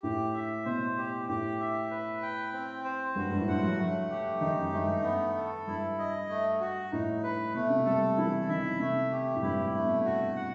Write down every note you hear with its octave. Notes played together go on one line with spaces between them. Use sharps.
A2 G4
E5
B2 C5
G4
A2 G4
E5
B4
G5
C4
C5
G2 F#4
G2
A2
G2 F#5
F#3
F#3 A3
G4
D#3 D#4
F#2
G2 A3
G2
B3
A4
G2 E4
D#5
A3
F#4
A2 D#4
B4
B2 A3
C3
G3 A4
E3 E4
D#3 E5
C3 A3
G4
A2
G2 E4
A2
A3
B2
F#4
F#5